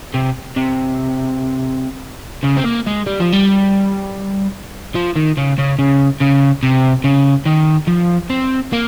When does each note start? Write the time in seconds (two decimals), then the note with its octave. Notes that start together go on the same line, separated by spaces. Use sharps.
0.14 C3
0.56 C3
2.44 C#3
2.58 C4
2.65 A#3
2.87 G#3
3.07 G3
3.20 F3
3.33 G3
4.95 F3
5.16 D#3
5.38 C#3
5.59 C#3
5.79 C#3
6.20 C#3
6.63 C3
7.04 C#3
7.46 D#3
7.88 F3
8.30 C4
8.73 A#3